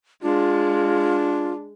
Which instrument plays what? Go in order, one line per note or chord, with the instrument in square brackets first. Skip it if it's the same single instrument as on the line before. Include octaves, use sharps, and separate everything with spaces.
[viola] G#3 [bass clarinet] D4 [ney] F4